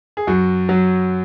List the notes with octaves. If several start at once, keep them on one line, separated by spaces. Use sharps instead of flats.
G#4
F#2 F#4
F#3